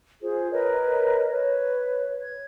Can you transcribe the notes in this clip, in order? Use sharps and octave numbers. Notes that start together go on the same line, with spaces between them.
F4 G#4 C5
A#4 B4 C#5 D#5
B4 C#5
G#6